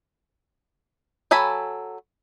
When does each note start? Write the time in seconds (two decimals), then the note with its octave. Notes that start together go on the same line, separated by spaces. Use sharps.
1.31 F#3 A4 G#5 B5